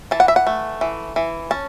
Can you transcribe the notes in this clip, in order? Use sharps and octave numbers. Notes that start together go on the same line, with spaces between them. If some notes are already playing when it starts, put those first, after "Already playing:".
E3 A5
F#5
E5
F#5
A3
E3
E3
C#4 A5